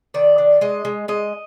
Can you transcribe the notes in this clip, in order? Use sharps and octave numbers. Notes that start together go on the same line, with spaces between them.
D#3 D5
D4
G#3 D#5
G#3
G#3 D#5